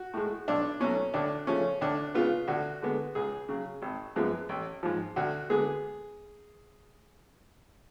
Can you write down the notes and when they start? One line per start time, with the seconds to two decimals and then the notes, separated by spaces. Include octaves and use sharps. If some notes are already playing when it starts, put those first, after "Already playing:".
Already playing: F#4
0.14 A2 G#3
0.48 B1 D4
0.80 B2 F#3 A3 C#4
1.14 D2 D4
1.47 C#3 F3 A3 C#4
1.81 D2 D4
2.14 C#3 G#3 B3 F4
2.48 D2 F#4
2.82 D3 G#3 B3
3.15 C#2 G#4
3.49 C#3 F#3
3.82 G#1
4.16 F#2 F3 G#3 B3
4.49 A1
4.83 G#2 F3
5.16 D2 F#4
5.49 D3 G#3 B3 G#4